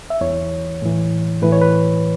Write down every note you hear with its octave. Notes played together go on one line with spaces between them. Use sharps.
E5
E2 E3 C#5
A2 E3
A2 E3 B4
C#5
B4